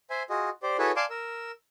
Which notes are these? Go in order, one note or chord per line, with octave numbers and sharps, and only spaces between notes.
C5 E5 G#5
F4 F#4 G#4 D#5
G4 C5 D5
E4 F#4 G#4 A4 B4 C#5
D5 F5 G#5 A5 C6 D6
A#4 E6